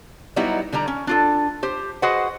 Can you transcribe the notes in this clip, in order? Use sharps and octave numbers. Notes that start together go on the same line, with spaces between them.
F#3 G3 B3 D#4 E4 F#4
D3 G3 G4 A#5
C#4
D4 F4 A4
G4 C5
F#4 G#4 B4 C5 D#5 F#5